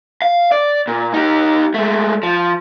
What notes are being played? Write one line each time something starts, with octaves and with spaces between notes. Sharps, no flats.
F5
D5
A#2
D#4 G4
G#3 A3
F3